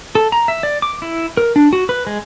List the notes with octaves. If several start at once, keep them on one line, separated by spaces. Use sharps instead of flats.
A4
A#5
E5
D5
D6
E4
A#4
D4
F#4
B4
G#3